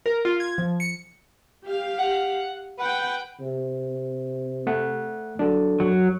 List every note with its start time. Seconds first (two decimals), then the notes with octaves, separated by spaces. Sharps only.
0.06 A#4
0.25 F4
0.40 G#6
0.58 F3
0.80 C#7
1.63 G4 F5
1.99 F#5
2.79 B4 F#5 G5
3.40 C3
4.67 A3 F#5 F#6
5.39 F#3 D4 A4
5.80 F#2 F#3